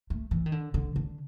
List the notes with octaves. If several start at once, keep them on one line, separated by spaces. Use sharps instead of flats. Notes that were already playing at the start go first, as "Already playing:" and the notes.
A3
E3
D#3
D3
D3
D3